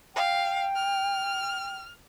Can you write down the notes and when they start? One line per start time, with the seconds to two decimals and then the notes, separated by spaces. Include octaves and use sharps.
0.15 F5 G5
0.75 F6